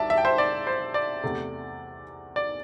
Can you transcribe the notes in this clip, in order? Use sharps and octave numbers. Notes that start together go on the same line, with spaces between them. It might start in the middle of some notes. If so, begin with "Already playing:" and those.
Already playing: C2 D5 E5 A5
E5
G5
C5 E5
D5
C5
D5
E2 C3 A3
D5